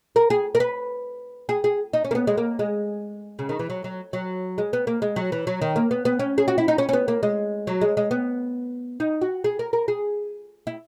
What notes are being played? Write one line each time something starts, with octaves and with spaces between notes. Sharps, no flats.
A#4
G#4
A#4
B4
G#4
G#4
D#4
C#4
A#3
B3
G#3
A#3
G#3
C#3
D#3
E3
F#3
F#3
F#3
G#3
B3
A#3
G#3
F#3
E3
F#3
D#3
A#3
B3
B3
C#4
G#4
F#4
E4
D#4
C#4
C#4
B3
A#3
G#3
F#3
G#3
G#3
B3
D#4
F#4
G#4
A#4
A#4
G#4
E4